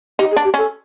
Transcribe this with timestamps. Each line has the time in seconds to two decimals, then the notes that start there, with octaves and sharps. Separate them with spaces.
0.19 D#4 G4
0.31 G#4
0.36 D4
0.44 G4
0.54 C#4 A4